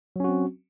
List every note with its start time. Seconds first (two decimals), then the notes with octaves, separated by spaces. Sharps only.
0.16 F#3
0.20 C#4
0.24 F#4
0.29 C4